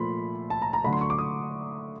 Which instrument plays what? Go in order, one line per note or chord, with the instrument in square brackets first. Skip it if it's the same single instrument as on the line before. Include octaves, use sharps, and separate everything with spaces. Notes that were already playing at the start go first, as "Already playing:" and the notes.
Already playing: [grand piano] A#2 F3 A3 B5 C6
A5
A#5
A#5
D3 F#3 A3 B5
C6
C#6
D6
D#6